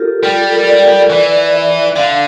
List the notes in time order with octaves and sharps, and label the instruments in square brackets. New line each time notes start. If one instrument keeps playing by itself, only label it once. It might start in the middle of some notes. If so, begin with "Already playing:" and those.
Already playing: [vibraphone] F4 G4 A4 A#4
[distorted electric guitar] G3 [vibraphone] F4
[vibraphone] A4
A#4
D5
[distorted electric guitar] E3
[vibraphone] E5
[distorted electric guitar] D3 [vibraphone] F5